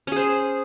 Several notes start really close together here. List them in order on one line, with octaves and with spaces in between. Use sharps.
C#4 G#4 C5